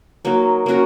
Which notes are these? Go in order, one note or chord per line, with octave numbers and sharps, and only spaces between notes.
F#3 A#3 D#4
A#3 C#4 F#4 A#4